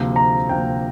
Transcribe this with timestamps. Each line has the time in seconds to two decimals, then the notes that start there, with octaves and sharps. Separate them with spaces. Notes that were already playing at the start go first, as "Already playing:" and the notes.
Already playing: D2 C3 F3 A#3
0.16 A#5
0.49 D2 C3 F3 A#3 G5